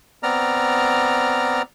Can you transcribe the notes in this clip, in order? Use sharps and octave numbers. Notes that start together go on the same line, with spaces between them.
B3 C4 D5 A#5 F6